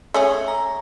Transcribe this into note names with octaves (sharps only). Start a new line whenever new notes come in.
A3 C#4 G#4 C#5
A#5